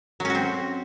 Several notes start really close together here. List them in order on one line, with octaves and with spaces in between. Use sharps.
F#3 C#4 F#4 C4